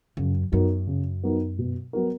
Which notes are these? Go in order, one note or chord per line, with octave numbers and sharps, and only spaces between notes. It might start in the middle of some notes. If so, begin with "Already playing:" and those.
F#2 C#3
F#2 F#3 B3 D#4 A#4
C#3
F#3 B3 D#4 A#4
B2
F#3 B3 F#4 A#4